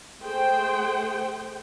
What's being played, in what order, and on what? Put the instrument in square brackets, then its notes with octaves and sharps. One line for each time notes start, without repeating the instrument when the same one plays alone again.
[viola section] A3 G#4 C5 G5